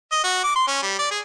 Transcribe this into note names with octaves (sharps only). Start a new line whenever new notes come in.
D#5
F#4
D6
C6
C#4
G3
D5
G#4